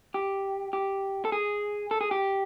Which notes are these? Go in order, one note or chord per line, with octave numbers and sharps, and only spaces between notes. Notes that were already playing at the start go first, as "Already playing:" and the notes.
G4
G4
A4
G#4
A4
G#4
G4